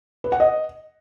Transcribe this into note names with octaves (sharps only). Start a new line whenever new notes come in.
B4
F#5
D#5